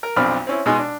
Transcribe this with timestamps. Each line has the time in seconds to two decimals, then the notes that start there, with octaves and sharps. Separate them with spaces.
0.03 A#4
0.16 B1 F2 C4 D4 B5 F6
0.47 C4 C#4 E4
0.66 B2 G#3 D#4 G#5 C6
0.79 D4